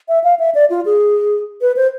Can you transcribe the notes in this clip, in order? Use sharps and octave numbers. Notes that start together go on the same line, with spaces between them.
E5
F5
E5
D5
F4
G#4
B4
C5